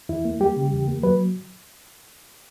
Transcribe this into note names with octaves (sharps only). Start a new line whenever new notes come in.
E2 E4
A#3
G3 G4
C#3
E2
A#3
F#3 B4